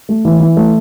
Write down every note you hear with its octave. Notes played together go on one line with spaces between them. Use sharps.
A3
E3
E3
A3